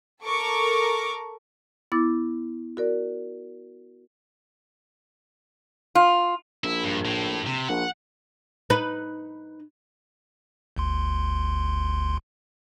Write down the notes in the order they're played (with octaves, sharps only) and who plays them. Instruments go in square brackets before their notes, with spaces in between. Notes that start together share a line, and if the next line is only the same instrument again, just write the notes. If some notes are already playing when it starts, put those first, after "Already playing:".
[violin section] A4 A#4 C#6 D6
[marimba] B3 E4 D6 A6
F#4 A#4 D5
[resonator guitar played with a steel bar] F4
[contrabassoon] A#1 [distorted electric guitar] E4
[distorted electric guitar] G2
A2
C3
[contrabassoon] A#1 [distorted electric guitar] F#5
[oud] D#4 B4
[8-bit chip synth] G1 D2 C6